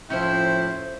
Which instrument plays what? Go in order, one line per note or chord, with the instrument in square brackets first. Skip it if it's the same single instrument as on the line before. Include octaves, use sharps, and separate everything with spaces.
[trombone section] A2 F3 [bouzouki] C#4 C5 [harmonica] E4 [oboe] G5